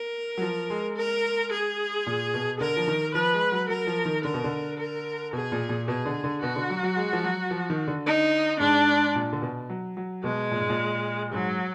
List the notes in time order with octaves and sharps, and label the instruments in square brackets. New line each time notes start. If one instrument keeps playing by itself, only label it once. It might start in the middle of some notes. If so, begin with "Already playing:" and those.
Already playing: [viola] A#4
[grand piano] F#3
F3
G#3
[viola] A#4
G#4
[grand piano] A#2
B2
[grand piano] D3 [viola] A#4
[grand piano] F3
D#3
[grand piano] F3 [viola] B4
[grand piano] G#3
F#3
[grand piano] F#3 [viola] A#4
[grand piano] F3
D#3
[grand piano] D3 [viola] A#4
[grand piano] B2
D3
[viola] A#4
[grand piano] B2 [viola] G#4
[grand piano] A#2
A#2
[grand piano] B2 [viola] G#4
[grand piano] D3
D3
[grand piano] B2 [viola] F#4
[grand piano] D3
F#3
F#3
G#3
F3
F#3
F3
D#3
D3
[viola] D#4
[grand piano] G#2 [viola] D4
[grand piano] A#2
D3
B2
F#3
F#3
[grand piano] B2 [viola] G#3
[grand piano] A#2
G#2
A#2
[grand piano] G#2 [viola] F#3